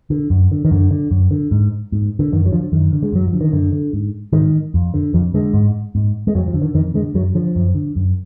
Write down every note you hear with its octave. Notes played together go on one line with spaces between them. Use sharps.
D3
F#2
D3
D#3
F#2 D3
D3
F#2
D3
G#2
G#2
D3
F#2 D#3
F#3
D3 F3
F#2 D#3
D3
G#3
F#2 F#3
F3
D3
D#3
F#2 D3
D3
G#2
G#2 D#3
F2
D3
F2 F3
D3 G#3
G#2
G#2
G#3
F2 F#3
F3
D3
D#3
F2 D#3
D3 G#3
F#2 F#3
D3 F3
F#2
D3
F#2